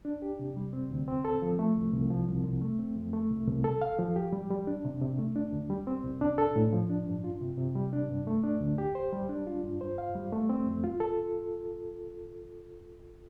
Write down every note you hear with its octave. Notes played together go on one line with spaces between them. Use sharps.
D4
G4
C3
G3
C4
D2
C4
A4
F3
A3
C2
C2
F3
C2
C2
A3
C4
F2
A3
C2
C2
A4
F5
F3
G4
G3
G3
D4
C3
C3
A3
D4
D2
G3
C4
C2
D4
A4
A2
F3
D4
G2
F4
C3
C3
G3
D4
G2
A3
D4
D2
G4
C5
G3
D4
F4
G2
C5
F5
G3
A3
C4
F2
F4
A4